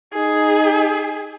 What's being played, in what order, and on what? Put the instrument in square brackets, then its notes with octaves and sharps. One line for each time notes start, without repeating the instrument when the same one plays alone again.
[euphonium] D#4 [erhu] G#4